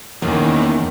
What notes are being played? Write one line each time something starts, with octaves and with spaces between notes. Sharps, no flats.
E2 D#3 A#3 C#4